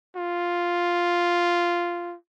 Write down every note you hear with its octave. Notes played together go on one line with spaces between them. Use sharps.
F4